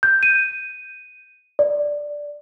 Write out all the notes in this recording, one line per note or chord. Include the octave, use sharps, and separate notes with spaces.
G6
D#7
D5